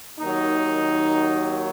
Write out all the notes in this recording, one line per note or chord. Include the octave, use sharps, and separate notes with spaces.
D#2 D#3 F#3 D#4